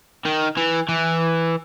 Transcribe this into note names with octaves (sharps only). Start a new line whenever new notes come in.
D#3
E3
E3